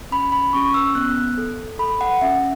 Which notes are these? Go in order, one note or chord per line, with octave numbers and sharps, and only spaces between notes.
C#4 B5
B5
C#4 C#6
E6
B3 F#6
A4
A4 B5
F#5
C#4 E5